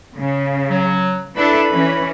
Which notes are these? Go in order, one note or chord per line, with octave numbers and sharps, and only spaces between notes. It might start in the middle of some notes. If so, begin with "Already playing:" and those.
C#3
F#3
D4 E4 A4 B4 B5
E3 C#4